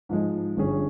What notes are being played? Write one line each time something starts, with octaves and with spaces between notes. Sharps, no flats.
G#2 F3 G#3 D#4
G1 G2 G3 C#4 G#4